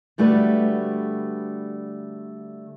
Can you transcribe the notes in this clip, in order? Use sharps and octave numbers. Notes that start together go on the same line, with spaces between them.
D3 G3 A3 F#4 B4